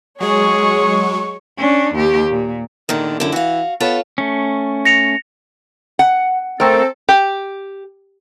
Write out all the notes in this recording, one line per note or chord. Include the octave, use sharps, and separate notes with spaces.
F#3 G#3 G#4 C#5 C#6
C#4 D4
D#2 G4
A#2
E2 A#2 D3 D#3
F#2 D3 E4
E3 F#4 F5
B3 F4 A4 C#5
A3 C#4
A#6 C#7 F7
F#5
A3 C4 A4 A#4
G4